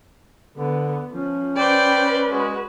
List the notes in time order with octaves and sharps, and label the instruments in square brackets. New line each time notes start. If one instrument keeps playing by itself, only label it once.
[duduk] D3 [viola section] B3
[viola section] F3 [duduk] C#4
[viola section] B4 [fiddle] C5 D5 [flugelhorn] G5
[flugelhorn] G#3 [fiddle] F#4